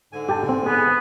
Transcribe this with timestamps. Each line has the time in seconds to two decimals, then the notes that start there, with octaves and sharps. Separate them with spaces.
0.12 G#2 D3 G#5
0.29 G4 G5 A5
0.49 C4
0.66 B3 G#4